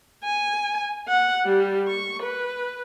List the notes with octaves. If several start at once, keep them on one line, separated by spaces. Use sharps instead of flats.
G#5
F#5
G3
C#6
B4